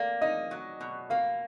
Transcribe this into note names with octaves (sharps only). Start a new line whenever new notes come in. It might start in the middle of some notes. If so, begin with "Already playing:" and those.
Already playing: A#3 D5
D#4 D#5
F#3
B2
A#3 F5